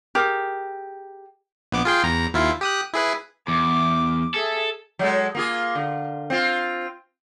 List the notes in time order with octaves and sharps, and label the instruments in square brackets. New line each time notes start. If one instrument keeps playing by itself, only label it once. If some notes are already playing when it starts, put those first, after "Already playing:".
[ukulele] G4 G#4 A#4
[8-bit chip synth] A#1 B3 D6
F4 G#4 G5
E2 A#5
D#2 E4 F4
G4 D#6 F#6
E4 G#4 B4
[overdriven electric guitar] E2 [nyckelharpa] D6
[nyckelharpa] G#4 E5 [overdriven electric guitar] A4
[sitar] F#3 G#3 A4
A#3 F4 G#4
D3
C4 F4